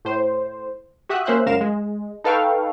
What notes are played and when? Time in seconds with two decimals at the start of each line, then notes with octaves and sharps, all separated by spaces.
0.05 A2 C5
1.09 F#4 G4 E5 D#6 F#6
1.25 A#3 C#4 C5 E5 F#6
1.46 C#2 F#2 A#4 F5 E7
1.61 G#3
2.24 D#4 A4 B4 F5 G5 C#6